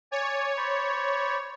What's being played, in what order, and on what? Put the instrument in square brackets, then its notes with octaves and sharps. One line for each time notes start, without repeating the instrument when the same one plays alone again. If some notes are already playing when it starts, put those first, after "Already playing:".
[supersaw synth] C#5 [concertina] D5 G#5
[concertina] C5 D5 B5